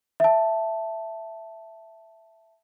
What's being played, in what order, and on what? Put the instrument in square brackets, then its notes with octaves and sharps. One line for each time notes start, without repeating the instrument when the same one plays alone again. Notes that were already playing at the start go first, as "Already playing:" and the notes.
[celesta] E5 A5